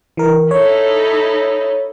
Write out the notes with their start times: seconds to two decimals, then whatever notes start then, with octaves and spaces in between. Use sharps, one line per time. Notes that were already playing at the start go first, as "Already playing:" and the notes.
0.17 E3 A#4
0.51 D#4 E4 A4 C#5